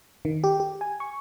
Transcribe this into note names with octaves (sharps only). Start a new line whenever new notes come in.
D#3
G4
G4
G#5
C#6